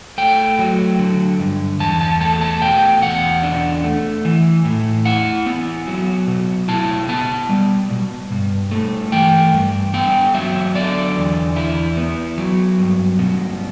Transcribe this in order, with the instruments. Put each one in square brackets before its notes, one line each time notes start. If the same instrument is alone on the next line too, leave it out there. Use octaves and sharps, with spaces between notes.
[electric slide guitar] A3 G5
F#3
D3
G2
E2 A5
A5
A3 A5
A5
B2 G5
E2 F#5
D4
A3
E3
A2
E4 F#5
B3
F#3
B2
E4 A5
B3 A5
G3
B2
G2
A3
E3 G5
G2
B3 G5
F#3 E5
D3 D5
E2
E4
B3
F#3
G2
B2